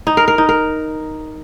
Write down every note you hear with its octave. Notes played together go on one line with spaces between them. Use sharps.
D#4
A#4
A#4
D#4
A#4